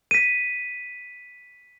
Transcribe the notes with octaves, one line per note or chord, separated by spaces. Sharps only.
B6 D#7